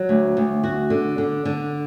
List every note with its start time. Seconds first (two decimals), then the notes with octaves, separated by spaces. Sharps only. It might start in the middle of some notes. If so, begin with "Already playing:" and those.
Already playing: F#3
0.09 D2
0.37 D2
0.64 F#4
0.90 D3
1.18 D3
1.45 D3